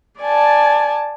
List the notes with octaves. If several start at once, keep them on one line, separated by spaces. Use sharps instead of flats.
D5 G#5 A5